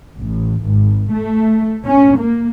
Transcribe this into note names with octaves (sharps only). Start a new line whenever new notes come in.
A1
G#1
A3
C#4
A#3